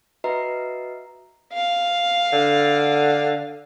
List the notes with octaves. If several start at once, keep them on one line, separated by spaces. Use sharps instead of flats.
F#4 B4 D#5 E5 A#5 C7
F5
D3